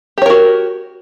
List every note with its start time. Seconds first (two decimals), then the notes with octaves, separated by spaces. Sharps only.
0.18 G4
0.22 C#5
0.26 A#4
0.30 F#4